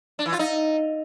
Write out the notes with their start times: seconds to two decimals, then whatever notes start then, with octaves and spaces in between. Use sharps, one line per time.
0.19 D4
0.26 E3
0.33 F4
0.39 D#4